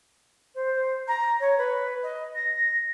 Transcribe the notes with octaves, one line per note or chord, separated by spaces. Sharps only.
C5
A#5
C#5
B4
D#5
A#6